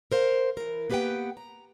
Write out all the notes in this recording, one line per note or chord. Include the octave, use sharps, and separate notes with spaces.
A#4 C5 F5
E3 A#4
A#3 B3 G4 B4 F#5 G5
A#5